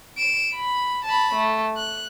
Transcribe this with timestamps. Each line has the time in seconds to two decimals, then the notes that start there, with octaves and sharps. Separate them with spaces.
0.17 D7 E7
0.55 B5
1.05 A5 B5
1.35 A3
1.77 F#6